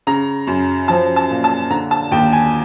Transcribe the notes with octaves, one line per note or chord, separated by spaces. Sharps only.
C#3 A#5
F#2
F3 A5
A5
A#2
A5
D3 A#5
A5
D#2 G5
G#5